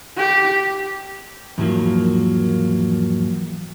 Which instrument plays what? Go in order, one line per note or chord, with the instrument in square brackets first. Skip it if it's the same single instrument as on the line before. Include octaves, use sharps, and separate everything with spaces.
[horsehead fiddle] G4
[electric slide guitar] E2 G#2 F3 F#3 A#3